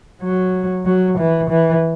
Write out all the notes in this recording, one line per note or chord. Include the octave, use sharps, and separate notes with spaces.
F#3
F#3
E3
E3